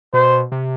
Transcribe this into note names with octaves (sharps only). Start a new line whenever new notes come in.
B2 C5
C3